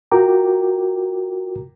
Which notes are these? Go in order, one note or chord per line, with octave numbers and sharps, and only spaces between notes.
F4 F#4 A#4 G5 A#5 D6